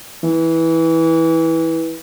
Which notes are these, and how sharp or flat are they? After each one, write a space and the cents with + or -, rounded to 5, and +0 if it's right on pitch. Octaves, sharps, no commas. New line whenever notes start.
E3 -15